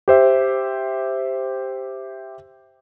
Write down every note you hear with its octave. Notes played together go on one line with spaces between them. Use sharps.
G4 C5 E5